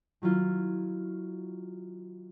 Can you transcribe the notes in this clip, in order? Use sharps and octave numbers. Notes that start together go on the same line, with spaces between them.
D#3 F#3 E4 F4